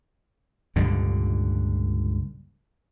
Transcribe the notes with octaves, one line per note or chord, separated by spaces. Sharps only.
C#2 G2 A#2 D3